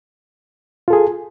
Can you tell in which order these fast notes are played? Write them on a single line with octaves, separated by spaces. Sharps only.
F4 A4 G#4